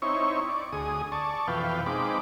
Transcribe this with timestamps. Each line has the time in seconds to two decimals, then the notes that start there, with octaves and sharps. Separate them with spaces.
0.02 C4 D#4 E4 C#5 C#6
0.49 D5
0.73 D2 G#4 D#6
1.12 D5 A5 C#6
1.48 F2 B2 E3 B4 F5 G5
1.86 G#3 C4 D#4 B5 D6